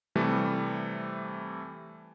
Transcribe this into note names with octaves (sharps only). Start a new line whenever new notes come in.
C3 E3 G3 A3